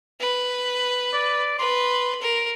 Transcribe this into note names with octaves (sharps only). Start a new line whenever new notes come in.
B4
D5
B4 C6
A#4